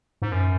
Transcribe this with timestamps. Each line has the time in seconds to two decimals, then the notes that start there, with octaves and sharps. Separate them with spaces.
0.22 G#2
0.32 F#2